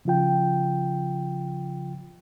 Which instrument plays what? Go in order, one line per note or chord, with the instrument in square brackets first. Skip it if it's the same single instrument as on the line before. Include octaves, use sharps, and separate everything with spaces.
[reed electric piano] C#3 F3 F4 G5